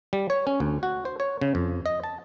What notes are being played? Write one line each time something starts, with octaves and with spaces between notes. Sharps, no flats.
G3
C#5
C#4
D2
F#4
C5
C#5
C#3
F2
D#5
A5